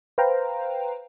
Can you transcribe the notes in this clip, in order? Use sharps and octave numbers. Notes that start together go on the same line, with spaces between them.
B4 C5 F5 G5 A#5